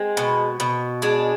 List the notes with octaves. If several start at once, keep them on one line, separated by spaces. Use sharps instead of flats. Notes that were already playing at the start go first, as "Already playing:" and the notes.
Already playing: G#3 C4
B2
B2
G#3 D4